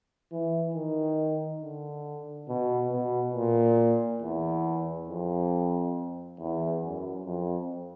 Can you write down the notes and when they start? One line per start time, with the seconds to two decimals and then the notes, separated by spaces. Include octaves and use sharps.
0.32 E3
0.75 D#3
1.62 D3
2.49 B2
2.92 B2
3.35 A#2
4.22 E2
5.09 F2
6.39 E2
6.82 F#2
7.26 F2